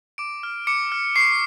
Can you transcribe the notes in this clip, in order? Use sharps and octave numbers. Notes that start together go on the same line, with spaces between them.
D6 D7
F6
D6 C#7
F6
C#6 C7